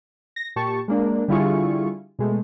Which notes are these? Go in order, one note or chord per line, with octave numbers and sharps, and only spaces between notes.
A#6
A#2 G4 A5 C#6
G#3 A#3 D4
D3 G3 E4 F4 G#4 C#6
B2 G#3 A3